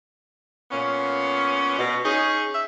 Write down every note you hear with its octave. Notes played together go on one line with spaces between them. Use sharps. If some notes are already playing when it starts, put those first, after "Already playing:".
A#2 B3 C#4
B2
C#4 D#4 G#4
E5